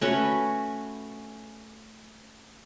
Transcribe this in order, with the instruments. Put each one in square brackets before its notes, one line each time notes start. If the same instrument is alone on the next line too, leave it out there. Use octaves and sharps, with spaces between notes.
[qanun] A3 C#4 F#4 B4